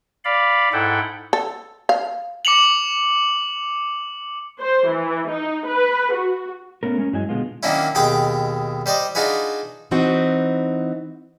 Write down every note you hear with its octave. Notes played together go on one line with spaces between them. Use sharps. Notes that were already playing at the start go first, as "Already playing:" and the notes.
D5 F5 B5
G#2 E4 A4 F#5 G5
A4
F5
D6 C#7 F7 F#7
C5
E3
D#4
B4
F#4
A3 B3 C#4 A#4
G#3 C#4 A#4
G2 F#3 G#3 E4 D#5 G#5
B2 D3 G#3 B3 F4
D#3 F#3 A#3 C#4 D4 E4
D#2 B2 G#4 G5 D6
G3 C5 D5 D#5
D4 D#4 F4 F#4 G#4 B4
E3 C4 D#4 F#4